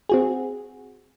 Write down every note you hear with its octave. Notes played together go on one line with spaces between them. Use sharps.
C4 F#4 G#4